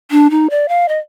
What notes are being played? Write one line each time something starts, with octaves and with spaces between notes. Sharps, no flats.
D4
D#4
D5
F5
D#5